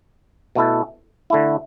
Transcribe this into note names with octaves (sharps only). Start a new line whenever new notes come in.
B2 A3 E4 A4
D3 A3 E4